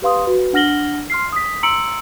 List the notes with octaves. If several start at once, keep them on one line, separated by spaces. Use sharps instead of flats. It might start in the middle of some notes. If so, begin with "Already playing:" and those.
G4 B4 F5 C6 D#6
F#4 B4
D4 F#5 F6 A#6 F#7 G7
C6 F6 C7
D#6 B6
A#5 C6 E6 C#7 D7 F#7